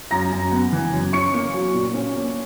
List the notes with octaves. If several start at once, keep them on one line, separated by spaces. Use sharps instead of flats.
F#2 A#5 A#6
F#2
B3
E3
F#2
C#4 C#6 C#7
A#3
F#3
A#2
C#4
A#3